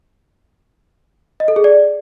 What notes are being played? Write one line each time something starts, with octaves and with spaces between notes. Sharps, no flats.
D#5
A4
G#4
D5